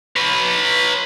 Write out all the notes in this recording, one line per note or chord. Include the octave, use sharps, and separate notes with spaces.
B4 C#5